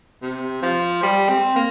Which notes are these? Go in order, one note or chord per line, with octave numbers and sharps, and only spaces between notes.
C3
F3
G3
C4
A#3